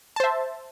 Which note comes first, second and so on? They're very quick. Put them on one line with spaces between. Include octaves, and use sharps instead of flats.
A5 C5 E5